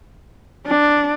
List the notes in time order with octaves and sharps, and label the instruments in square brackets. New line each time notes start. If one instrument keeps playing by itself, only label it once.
[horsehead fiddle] D4